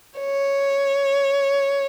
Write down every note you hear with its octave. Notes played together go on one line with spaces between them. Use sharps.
C#5